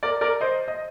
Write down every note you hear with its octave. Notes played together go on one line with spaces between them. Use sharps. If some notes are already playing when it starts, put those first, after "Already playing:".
A#4 D5
A#4 D5
C5 D#5
D#5